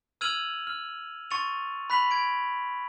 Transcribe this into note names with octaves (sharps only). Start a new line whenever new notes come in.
E6 F6 G#6 D#7 F7 F#7
F6
C6 C#6 A6 C#7 D#7 F7
B5 F#6 B6 F7 F#7
G#6 D7 F7